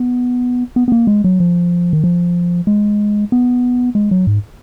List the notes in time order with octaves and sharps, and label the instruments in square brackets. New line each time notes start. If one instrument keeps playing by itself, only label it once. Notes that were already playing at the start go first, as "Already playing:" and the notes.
Already playing: [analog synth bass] B3
B3
B3
A#3
G#3
F#3
F3
D#3
F3
G#3
B3
G#3
F#3
G#2